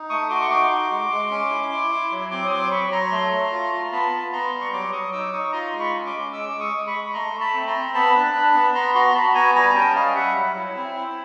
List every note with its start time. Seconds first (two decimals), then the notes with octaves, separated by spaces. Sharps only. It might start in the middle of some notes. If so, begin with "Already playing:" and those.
Already playing: D#4
0.10 A3 C#6 D#6
0.30 F#4 C6 D6
0.41 C#6
0.50 D#4 C6 D6
0.71 F#4
0.91 G#3
1.10 G#3
1.31 C#4
1.51 E4
1.71 E4
1.91 E4
2.11 F#3
2.31 C4 C6 D6
2.47 D#6
2.51 F#3 C6 D6
2.71 F#3 B5 C#6
2.92 F#3 A#5 C6
3.11 A3
3.32 A3
3.52 F4
3.73 F4
3.92 B3 A5 B5
4.12 B3
4.32 B3 A#5 C6
4.53 G3
4.61 C#6
4.72 F#3 C6 D6
4.92 F#3 C#6 D#6
5.12 D#4 D6 E6
5.33 D#4 C#6 D#6
5.52 F4 A#5 C6
5.71 G#3 C6
5.79 B5 C#6
5.93 C#4
6.06 C6 D6
6.14 G#3
6.33 G#3 D6 E6
6.49 G#3 D6
6.60 C#6 D#6
6.73 G#3
6.87 B5 C#6
6.94 G#3
7.04 B5
7.14 A3 A#5 C6
7.34 A3
7.40 A5 B5
7.54 C4
7.67 A#5 C6
7.74 C4
7.94 B3 A5 B5
8.15 D4
8.35 D4
8.54 B3
8.74 B3 A#5 C6
8.95 F#4 A#5 C6
9.10 C6
9.15 F#4 A5 B5
9.35 B3 G#5 A#5
9.55 G3 G#5 A#5
9.70 A#5
9.75 C#4 G5 A5
9.95 G3 D#5 F5
10.15 G3 E5 F#5
10.36 F#3
10.56 E4
10.75 C4
10.96 E4